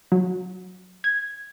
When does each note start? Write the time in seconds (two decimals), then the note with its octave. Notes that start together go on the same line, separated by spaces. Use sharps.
0.12 F#3
1.04 G#6